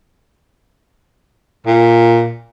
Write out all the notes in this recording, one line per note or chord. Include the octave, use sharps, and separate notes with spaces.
A#2